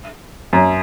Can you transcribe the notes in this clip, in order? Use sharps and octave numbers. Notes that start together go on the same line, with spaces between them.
F#2